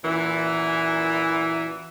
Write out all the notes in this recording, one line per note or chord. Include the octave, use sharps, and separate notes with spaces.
F#2 A#2 E3